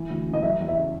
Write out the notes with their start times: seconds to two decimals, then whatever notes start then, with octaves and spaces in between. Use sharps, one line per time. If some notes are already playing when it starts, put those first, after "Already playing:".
Already playing: E3
0.10 D2
0.27 C#3
0.33 D#5
0.43 F#3 E5
0.61 E2
0.68 E5
0.76 C#3